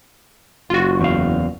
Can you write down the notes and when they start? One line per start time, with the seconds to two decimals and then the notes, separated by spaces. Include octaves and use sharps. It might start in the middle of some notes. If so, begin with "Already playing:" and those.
0.70 F#1 F4 F#4
1.01 E2 F5